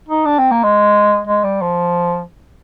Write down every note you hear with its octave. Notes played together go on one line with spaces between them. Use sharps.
D#4
D4
C4
A#3
G#3
G#3
G3
F3